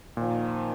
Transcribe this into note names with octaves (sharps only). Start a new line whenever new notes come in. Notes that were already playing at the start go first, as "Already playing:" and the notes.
A#2 D#3 F3